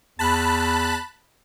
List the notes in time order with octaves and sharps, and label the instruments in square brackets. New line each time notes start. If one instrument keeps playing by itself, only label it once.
[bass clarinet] E2 [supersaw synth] A5 B5 F#6